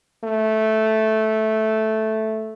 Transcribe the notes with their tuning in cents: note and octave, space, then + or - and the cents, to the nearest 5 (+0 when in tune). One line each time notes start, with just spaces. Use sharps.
A3 -5